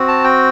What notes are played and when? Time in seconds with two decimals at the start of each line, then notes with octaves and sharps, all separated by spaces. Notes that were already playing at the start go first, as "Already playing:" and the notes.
Already playing: C4 F#4
0.08 A5
0.24 G5